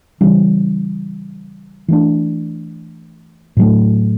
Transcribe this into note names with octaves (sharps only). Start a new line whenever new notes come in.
C#3 E3 G3 C#4
E3 A3 D4
A2 F#3 A3